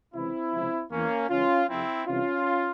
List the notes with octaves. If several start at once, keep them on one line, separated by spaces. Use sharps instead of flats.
C#2 C3 E3 C4 E4
C#2 C3 F3
E2 E3 A#3 C#4
C#2 C#3 E3 C#4 F4
F2 C3 F3 C4 E4
C2 C3 E3 C#4 F4